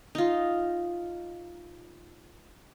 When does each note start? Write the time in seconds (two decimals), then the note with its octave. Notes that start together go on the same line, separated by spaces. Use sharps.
0.15 D#4 F4